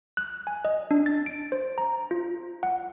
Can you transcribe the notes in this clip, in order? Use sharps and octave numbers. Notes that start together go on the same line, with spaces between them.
F#6
G#5
D#5
D4
A6
D7
C5
A#5
F4
F#5